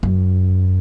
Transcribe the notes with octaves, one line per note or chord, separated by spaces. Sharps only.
F#2